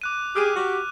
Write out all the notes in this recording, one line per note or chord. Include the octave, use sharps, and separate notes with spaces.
D6 F#6 D#7
G4 G#4 F6 D#7
F#4 G4